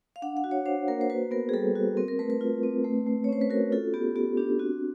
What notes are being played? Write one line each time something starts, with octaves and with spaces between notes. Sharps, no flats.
F5
D4 F#5
F#5
F#4
C#5
D4 C5
A#3 A#4
C5
F#4 B4
B3 A#4
G#4
G3 A4
F#4
C4 A#4
A#4
A3 B4
B4
F4
C4
A3
A3
C#5
C#4 C5
B4
F#4 A#4
F4 A4
B3 G4
B3 G4
D4 G4
C4 F#4